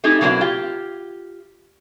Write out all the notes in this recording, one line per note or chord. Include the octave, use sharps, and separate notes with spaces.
A3 C4 D#4 E4 G4 G#4
B2 F#3 A#3 C4 D4 E4
F4 G4